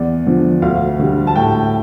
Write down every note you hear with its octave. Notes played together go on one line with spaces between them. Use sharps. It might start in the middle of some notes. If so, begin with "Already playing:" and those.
Already playing: E2 D5
D3 F3
D2 F5
D3 G3
A5
A2 G5